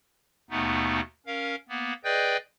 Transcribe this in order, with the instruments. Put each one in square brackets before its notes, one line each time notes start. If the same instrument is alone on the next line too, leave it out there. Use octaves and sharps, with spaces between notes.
[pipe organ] D#2 B2 A3 B3 D#4
C#4 A#4 F5
A#3 B3
G#4 B4 D5 D#5 G5 G6